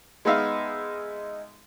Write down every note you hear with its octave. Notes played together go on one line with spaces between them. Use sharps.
G#3 B3 D#4 E5 F5